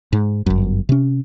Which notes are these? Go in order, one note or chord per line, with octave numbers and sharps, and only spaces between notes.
G#2
G1 F#2
C3 C#4